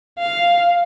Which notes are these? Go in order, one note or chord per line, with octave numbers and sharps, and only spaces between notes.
F5